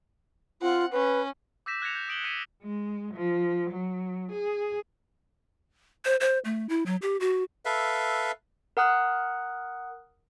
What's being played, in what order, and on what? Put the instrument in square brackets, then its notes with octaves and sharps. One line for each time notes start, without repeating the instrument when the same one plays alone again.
[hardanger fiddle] C4 F#5 [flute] F4
[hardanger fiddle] C#4 [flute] B4
[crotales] D6 E6 G6 A#6 B6 E7
F#6 G#6 A#6 C#7 F7
G6
D#6 D7 F#7 G7
F#6 B6 C#7 D#7
[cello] G#3
F3
F#3
G#4
[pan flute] C5
C5
A3
E4
F#3
G4
F#4
[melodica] A4 B4 E5 F5
[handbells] A#4 F#5 D#6 F#6